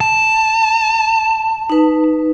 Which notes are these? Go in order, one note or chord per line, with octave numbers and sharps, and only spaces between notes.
A5
D#4 B4